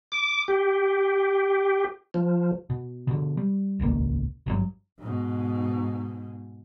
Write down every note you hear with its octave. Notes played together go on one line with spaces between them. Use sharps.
D6
G4
F3
B2
B2 D3
G3
D#1 G#1 C#2 A#3
G#1 G2 D3 F#3
G#2 B2